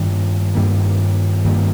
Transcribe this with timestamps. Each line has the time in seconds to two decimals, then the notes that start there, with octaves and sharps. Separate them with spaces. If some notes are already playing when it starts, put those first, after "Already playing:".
Already playing: G2 D#3 G3 A#3
0.55 G2 D#3 G3 A#3
1.45 G2 D#3 G3 A#3